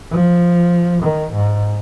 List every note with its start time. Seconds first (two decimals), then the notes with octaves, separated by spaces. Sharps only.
0.11 F3
1.03 D#3
1.33 G#2